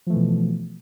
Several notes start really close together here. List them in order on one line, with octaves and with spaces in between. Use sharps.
F3 A3 E3 B2